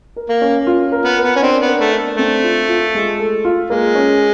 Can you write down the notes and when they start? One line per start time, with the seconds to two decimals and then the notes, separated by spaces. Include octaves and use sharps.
0.16 A#4
0.30 A#3
0.42 C#4
0.67 F4
0.92 A#4
1.05 B3
1.17 A#4
1.24 B3
1.36 C#4
1.42 C4 D4
1.62 B3
1.68 A#4
1.81 A3
1.93 D4
2.18 A3 C4
2.44 F4
2.69 F4
2.95 G#3
3.19 A4
3.45 F4
3.70 G#3 A#3
3.95 C#4